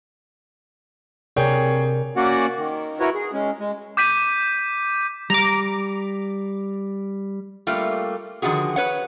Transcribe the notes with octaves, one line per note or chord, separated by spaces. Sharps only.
C3 G#4 A#4 C#5 D5 G5
A#3 C#4 F#4 D5 F#5
D#3
E4 F#4 A#4 B4 C#5
G#4
G#3 C#4
G#3
D6 G6 B6 D#7
G3 A#5 D6
G3 A3 A#3 F4
D3 D#3 F3 F#4 G#4
B4 C#5 F#5